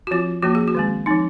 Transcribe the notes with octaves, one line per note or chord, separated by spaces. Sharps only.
F#4
F3 C4 F4
F3 A#3 C#4 F#4
G#4
F#4
D#3 G#3 C4
F3 C4 D#4